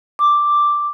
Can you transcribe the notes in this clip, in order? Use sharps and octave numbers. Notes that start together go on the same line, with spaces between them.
D6